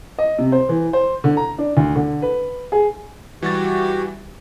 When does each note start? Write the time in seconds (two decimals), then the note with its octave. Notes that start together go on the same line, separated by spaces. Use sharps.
0.19 D#5
0.39 C3
0.52 C5
0.69 E3
0.93 C5
1.24 D3
1.37 A#5
1.58 D4
1.77 D2
1.95 D3
2.22 B4
2.72 G#4
3.42 E3 G3 F#4 G4 A6